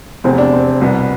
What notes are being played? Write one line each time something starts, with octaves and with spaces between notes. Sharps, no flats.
F1 E2 C3 C4
D4
C4
C2 B2 B3